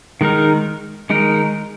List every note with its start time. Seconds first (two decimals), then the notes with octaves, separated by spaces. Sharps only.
0.21 D#3 G#3 D#4 A#4
1.10 D#3 G#3 D#4 A#4